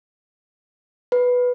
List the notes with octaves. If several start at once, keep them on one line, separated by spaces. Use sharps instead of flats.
B4